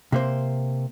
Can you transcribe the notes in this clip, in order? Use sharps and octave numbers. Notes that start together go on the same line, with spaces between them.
C3 A#3 C5